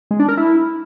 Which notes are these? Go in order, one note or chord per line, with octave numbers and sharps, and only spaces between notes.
G#3
D4
A#4
E4